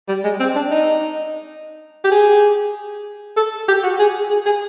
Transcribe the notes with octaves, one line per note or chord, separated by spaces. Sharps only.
G3
G#3
C4
D4
D#4
G4
G#4
A4
G4
F#4
G#4
G#4
G#4